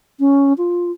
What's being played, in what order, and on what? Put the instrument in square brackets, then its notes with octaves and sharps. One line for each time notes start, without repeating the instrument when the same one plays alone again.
[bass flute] C#4
F4